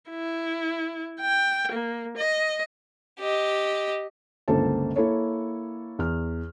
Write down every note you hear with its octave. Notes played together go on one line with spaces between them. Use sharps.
E4
G5
A#3
D#5
G4 D#5
G1 C#2 A#3 A4 C5 A5
A#3 E4 A4 C#5
E2 F6